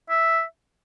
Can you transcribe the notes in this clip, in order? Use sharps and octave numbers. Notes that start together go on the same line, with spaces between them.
E5